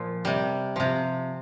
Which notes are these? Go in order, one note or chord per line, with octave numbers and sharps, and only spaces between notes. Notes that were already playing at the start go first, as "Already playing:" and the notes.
Already playing: A#2 F3
C3 G3
C3 F3